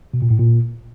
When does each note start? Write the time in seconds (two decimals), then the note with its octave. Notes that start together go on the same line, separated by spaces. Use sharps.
0.14 B2
0.22 A#2
0.31 A2
0.39 A#2